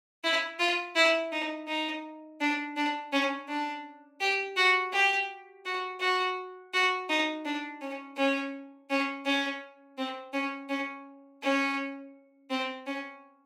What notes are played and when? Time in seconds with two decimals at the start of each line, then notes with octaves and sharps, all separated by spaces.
0.24 E4
0.59 F4
0.96 E4
1.32 D#4
1.68 D#4
2.41 D4
2.76 D4
3.12 C#4
3.49 D4
4.21 G4
4.56 F#4
4.93 G4
5.65 F#4
6.00 F#4
6.73 F#4
7.09 D#4
7.45 D4
7.81 C#4
8.17 C#4
8.90 C#4
9.25 C#4
9.97 C4
10.33 C#4
10.69 C#4
11.42 C#4
12.50 C4
12.86 C#4